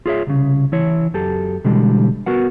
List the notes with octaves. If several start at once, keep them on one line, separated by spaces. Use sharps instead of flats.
F4 G#4 C#5 E5
C2 C#3
E3 E4 C#5
F#2 G4 A4
B2 D3 E3 G3 G#3
B3 F#4 A#4 F#5